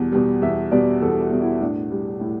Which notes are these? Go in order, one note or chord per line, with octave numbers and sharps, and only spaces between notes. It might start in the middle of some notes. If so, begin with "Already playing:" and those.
Already playing: E2 B2 G3
B2 G3
E2 E5
B2 G3 D5
E2 A4
F#4
B2 G3
E4
A2 D4
G3
A2 E4